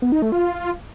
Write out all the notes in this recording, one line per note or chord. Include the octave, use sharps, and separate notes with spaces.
B3
D#4
A3
F4